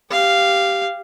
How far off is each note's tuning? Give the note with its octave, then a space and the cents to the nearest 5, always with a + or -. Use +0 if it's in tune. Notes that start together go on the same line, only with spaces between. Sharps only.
G4 +0 F5 -10